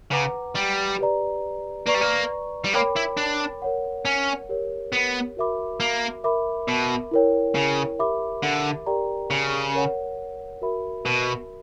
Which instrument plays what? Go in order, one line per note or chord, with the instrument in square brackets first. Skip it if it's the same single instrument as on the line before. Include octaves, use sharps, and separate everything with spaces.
[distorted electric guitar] C#3 [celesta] B4 F#5 A#5 D6
[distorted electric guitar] G3
[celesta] G4 B4 D5 A#5
[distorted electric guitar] A#3 [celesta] B4 D5 A#5 C#6
[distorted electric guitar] G3
A#3
G3
[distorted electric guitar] A#3 [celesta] A#4 C#5 G5 B5 D6
[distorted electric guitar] E4
D4
[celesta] A#4 C#5 F#5
[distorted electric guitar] C#4
[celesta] G4 A#4 C#5
[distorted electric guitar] B3
[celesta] F#4 A#4 E5 B5 D6
[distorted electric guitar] A#3
[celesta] A#4 E5 B5 D6
[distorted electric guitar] B2
[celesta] E4 A#4 C#5 G5
[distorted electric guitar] C#3
[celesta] G4 A#4 E5 B5 D6
[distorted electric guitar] D3
[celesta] G4 A#4 D5 G5 A#5
[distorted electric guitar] C#3
[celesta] A#4 C#5 F#5
F#4 A#4 E5 B5
[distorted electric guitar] B2